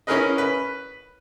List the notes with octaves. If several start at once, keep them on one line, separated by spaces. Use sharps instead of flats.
C#4 E4 G#4 A#4 B4 D#5
B4